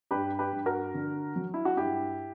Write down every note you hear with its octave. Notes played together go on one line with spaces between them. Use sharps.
G2 G4 B4
G4 B4
G2
F#4 A#4
D3
F#3
E4
F#4
G2 E4 G4